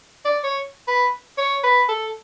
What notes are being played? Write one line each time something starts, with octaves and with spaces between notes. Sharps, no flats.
D5
C#5
B4
C#5
B4
A4